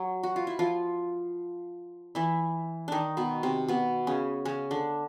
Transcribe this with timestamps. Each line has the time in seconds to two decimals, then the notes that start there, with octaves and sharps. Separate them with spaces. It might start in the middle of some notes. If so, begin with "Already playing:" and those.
Already playing: F#3
0.23 F#4
0.36 F4
0.47 E4
0.59 F3 F4
2.15 E3 E4
2.88 D#3 D4 D#4
3.17 B2 B3
3.43 C3 C4
3.68 B2 B3
4.07 C#3 C#4
4.45 C#3 C#4
4.71 D3 D4